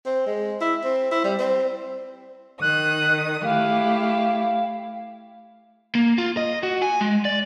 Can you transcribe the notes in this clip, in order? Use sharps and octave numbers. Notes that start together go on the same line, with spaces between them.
C4
G#3
E4
C4
E4
G3
C4
D#3 D#6 F#6
A3 E4 G4 F5
A#3
F4
D#5
F#4
G#5
G#3
D5